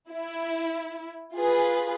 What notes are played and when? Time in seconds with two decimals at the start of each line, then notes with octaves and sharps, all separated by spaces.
0.10 E4
1.35 F4 G#4 B4